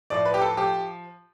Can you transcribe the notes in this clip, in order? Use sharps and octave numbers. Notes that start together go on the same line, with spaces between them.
A2 F3 D5
B4
G4
A4
F3 G4